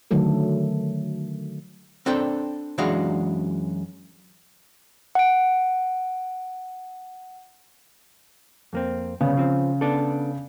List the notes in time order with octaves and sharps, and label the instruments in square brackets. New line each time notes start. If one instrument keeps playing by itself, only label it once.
[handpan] D3 D#3 F#3 A3 A4
[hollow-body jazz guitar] C4 D4 A4 G5
F#2 E3 G#3 D4 F#4 F5
[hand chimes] F#5 D7
[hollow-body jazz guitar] F2 A#3 C4
[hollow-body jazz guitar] C2 B3 [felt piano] C#3
[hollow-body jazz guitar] F3 C4
B3 D4 A4